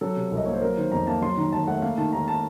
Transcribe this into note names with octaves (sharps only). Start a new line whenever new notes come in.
F#3 A4
C3
C2
D#5
A#3 C#5
C5
F#3 A#4
D#3 C5
F2 A#5
A#3 A5
F#3 C6
D#3 A#5
D#2 A5
A3 F#5
A#3 F5
D#3 A5
D#2 A#5
A5